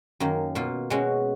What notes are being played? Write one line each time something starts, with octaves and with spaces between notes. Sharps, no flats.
F#2 D#3 A#3
B2 A#3 F4
B2 G#3 C#4 F#4